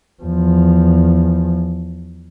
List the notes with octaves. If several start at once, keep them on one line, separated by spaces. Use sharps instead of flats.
E2 F3